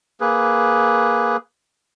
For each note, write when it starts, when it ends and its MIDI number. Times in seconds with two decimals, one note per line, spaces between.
0.21 1.37 58
0.21 1.37 68
0.21 1.37 71